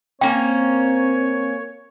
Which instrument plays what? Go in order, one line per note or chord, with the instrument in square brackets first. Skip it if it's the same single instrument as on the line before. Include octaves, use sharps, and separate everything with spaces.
[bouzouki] A#3 C#4 [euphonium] C4 [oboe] C#5 [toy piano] G5